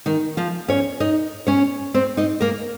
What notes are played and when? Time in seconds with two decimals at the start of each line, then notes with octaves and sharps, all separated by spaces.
0.06 D#3 D#4
0.37 F3 F4
0.68 C#4 C#5
1.00 D#4 D#5
1.47 C#4 C#5
1.94 C4 C5
2.17 D#4 D#5
2.41 A#3 A#4